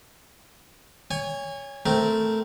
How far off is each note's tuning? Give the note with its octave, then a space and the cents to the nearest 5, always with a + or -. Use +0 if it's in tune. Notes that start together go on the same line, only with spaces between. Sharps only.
C#5 +15 G#5 -30
A3 +0 C4 -15 A#4 +0